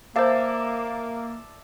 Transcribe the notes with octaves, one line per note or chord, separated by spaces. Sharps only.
A#3 C5 D5 E5 F5 A5